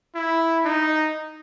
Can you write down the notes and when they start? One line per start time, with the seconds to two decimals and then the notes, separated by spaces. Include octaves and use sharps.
0.15 E4
0.65 D#4